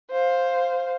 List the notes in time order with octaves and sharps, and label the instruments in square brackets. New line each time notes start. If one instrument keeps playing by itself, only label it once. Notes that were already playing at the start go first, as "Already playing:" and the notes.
[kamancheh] C5 F5